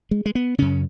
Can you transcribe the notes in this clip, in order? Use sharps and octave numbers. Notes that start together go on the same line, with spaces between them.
G#3
G#3
B3
F#2 C#3 C#4